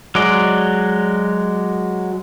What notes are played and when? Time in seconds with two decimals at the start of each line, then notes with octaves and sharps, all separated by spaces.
0.15 F#3 G#3 D5